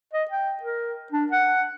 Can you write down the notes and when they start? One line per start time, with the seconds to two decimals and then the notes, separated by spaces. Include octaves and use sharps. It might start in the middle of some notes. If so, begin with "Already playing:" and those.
0.13 D#5
0.31 G5
0.63 A#4
1.12 D4
1.32 F#5